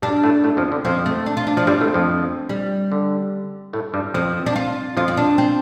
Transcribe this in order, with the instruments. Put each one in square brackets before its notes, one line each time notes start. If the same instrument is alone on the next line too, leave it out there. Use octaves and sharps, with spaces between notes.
[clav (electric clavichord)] G2 G3 [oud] D4
[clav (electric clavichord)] A2 A3
A2 A3
F2 F3
D3
[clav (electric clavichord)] F2 F3 [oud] C4
[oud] A3
D4
F4
D4
[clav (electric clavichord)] F3 [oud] D4
[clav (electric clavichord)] G2 G3 [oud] C4
[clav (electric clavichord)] A2 A3
F2 F3
[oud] G3
[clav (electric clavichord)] D3
A2 A3
G2 G3
[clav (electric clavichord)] F2 F3 [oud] C4
[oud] D4
F4
[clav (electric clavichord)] F2 F3 [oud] F4
[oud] C4
D4
C4